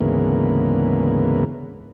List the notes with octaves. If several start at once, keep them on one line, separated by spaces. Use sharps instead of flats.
D2 G#2 C#3 E3 A#3 B3